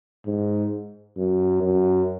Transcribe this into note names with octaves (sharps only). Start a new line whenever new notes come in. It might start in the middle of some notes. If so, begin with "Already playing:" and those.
G#2
F#2
F#2